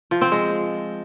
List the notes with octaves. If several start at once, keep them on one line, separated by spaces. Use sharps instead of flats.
F3
C4
G#3